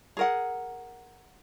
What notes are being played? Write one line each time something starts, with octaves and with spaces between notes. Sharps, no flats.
G#4 A#4 F#5